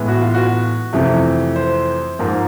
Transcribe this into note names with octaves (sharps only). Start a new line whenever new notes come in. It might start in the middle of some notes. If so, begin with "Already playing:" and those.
Already playing: A2 E3 G#3 B3
F#4
F4
F#4
F2 C3 E3 A3
C5
G#2 F3 A#3